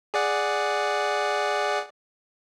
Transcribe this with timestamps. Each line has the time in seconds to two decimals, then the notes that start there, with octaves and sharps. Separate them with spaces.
0.14 G#4 D5 F#5